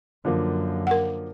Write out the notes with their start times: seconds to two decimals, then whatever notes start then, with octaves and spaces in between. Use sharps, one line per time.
0.25 F#2 D3 F3 A#3
0.87 A#4 F#5